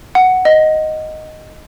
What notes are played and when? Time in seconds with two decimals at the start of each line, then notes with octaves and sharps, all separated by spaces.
0.15 F#5
0.45 D#5